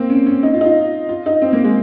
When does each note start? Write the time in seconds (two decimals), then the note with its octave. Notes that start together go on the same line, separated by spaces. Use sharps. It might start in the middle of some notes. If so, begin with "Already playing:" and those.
Already playing: A#3 C4
0.10 C#4
0.26 C#4
0.43 D#4
0.54 F4
0.61 D#4
0.65 F4
1.09 F4
1.26 D#4
1.42 C4
1.53 A#3
1.64 G#3